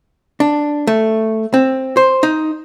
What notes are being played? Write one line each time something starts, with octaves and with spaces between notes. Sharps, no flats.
D4
A3
C4
C5
D#4